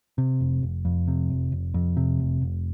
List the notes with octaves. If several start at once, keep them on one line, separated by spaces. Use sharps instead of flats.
C3
F1
F1
F2
C3
F1
F1
F2
C3
F1
F1